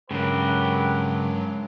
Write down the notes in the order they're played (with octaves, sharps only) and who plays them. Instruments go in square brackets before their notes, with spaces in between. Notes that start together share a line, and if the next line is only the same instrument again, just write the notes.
[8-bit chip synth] G2 F#3 [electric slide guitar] C#3 [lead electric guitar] G#3 A#4 [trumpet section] G4 B4 F#5